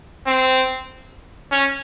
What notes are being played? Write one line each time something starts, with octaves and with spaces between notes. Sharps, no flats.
C4
C#4